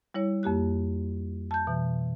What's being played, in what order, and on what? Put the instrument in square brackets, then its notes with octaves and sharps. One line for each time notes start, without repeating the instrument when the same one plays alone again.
[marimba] G3 E4 C#5
F2 A#3 G4 F#6
A5 G6
B2 E3